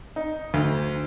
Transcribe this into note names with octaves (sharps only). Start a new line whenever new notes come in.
D#4
D2